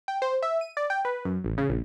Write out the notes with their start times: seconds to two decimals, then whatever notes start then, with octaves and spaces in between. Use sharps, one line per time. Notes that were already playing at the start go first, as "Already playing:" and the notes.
0.08 G5
0.22 C5
0.42 E5
0.61 D#7
0.77 D5
0.90 G5
1.05 B4
1.25 F#2
1.44 A1
1.58 C#3
1.69 A#1